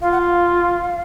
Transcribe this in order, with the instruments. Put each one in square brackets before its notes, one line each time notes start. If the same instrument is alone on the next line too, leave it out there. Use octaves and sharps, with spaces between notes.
[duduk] F4 [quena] F5
[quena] F#5
F5